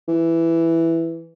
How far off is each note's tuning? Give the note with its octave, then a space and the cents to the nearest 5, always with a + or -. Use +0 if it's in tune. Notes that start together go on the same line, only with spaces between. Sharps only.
E3 +5